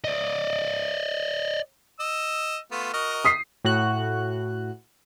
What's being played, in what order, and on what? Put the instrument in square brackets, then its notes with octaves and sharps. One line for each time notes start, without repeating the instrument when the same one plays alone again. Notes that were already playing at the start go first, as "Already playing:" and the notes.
[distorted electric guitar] D5 D#5
[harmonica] D#5 E6
A3 B3 F4
F#4 A#4 D#5
[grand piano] D#6 B6 C7
[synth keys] A2 F#4 F#6